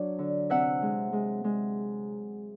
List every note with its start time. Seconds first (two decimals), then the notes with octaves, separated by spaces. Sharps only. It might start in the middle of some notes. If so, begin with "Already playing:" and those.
Already playing: F#3 D4
0.19 D3
0.50 C3 E5 F#5
0.82 G#3
1.13 G#3
1.44 G#3